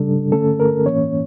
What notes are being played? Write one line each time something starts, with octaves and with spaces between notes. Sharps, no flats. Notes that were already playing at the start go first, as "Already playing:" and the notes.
Already playing: C#3 G3 D4 A4
D3 A3 C#4 A4
A#4
A2 E3 A#3 C#4 C#5